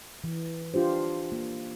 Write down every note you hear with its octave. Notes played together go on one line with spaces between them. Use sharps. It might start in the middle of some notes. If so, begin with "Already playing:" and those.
E3
D4 F4 G4 C5
A#3